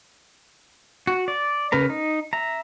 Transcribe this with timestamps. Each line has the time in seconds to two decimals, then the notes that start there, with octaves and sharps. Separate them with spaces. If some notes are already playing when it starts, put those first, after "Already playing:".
1.07 F#4
1.28 D5
1.72 C#3 A#4 B4 A#5
1.90 D#4
2.33 E5 A#5